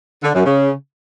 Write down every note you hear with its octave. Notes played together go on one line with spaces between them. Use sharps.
D3
F#2
C#3